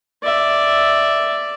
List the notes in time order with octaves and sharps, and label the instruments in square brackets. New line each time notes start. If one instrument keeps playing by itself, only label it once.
[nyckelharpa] D5 E5